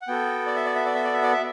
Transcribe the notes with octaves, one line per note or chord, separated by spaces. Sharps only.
F#5
B3 F#4 A4 G5
D5
E5
D5
E5
D5
E5
D5
E5
D5
E5